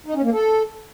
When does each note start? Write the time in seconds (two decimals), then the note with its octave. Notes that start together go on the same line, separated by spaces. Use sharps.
0.06 D#4
0.15 C#4
0.23 A#3
0.32 A4